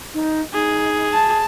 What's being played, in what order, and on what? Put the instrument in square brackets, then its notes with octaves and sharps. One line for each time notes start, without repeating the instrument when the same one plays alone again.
[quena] D#4
[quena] D#4 [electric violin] G#4
[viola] A5